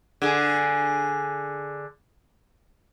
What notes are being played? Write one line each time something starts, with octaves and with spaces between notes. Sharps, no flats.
D3 G#4